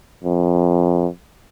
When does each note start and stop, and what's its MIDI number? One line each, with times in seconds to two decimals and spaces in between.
0.24 1.07 41